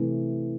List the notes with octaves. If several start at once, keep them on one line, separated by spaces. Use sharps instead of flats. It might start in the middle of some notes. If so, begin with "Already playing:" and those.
Already playing: C3 E3 A3